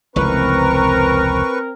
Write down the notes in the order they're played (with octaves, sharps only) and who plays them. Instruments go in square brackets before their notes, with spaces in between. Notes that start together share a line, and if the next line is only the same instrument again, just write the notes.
[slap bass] F1 C#2 E3 [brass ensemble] C4 A#4 [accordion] B4 C#6